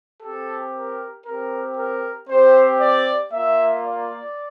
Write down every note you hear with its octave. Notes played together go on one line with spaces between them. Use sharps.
C4 G4 A4
A#4
C4 G4 A#4
A#4
C4 G4 C5
D5
A#3 F4 E5
D5